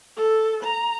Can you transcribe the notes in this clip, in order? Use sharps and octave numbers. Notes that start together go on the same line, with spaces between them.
A4
A#5